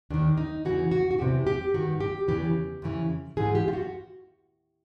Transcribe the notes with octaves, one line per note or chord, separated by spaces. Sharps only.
D#2 D#3 D4
D#4
E2 C#3 E3 F#4
F#4
F#4
E2 C3 E3 G4
G4
G2 D#3 F#4
G4
E2 C#3 E3 G4
F2 C#3 E3
G#2 E3 G#4
G4
F4
F#4